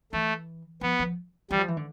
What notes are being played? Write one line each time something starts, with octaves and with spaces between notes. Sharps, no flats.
E3 A3
F3 B3
F3
E3 G3
F3
E3
D3